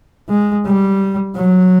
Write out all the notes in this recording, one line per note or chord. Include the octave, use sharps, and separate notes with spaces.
G#3
G3
F#3